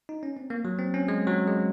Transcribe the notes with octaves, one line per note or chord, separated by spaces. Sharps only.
D#4
C#4
C4
A#3
F#3
C4
C#4
G#3
F#3
G#3